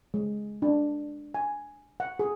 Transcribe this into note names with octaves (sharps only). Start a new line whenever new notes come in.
G#3
D4
G#5
F#5
G#4